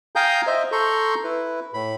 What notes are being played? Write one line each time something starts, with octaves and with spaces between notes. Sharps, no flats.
F5 G5 G#5 A#5 D#6 G6
C5 D#5 E5
A4 A#5 C6 C#6 G6
E4 B4
A2 B5